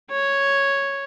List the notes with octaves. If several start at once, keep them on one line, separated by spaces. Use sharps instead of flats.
C#5